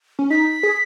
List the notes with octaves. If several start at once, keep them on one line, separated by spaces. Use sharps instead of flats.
C#4
D#4 B6
G#4